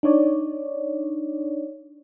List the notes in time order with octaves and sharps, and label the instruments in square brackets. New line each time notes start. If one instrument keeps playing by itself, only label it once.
[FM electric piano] D4 D#4 C#5 D5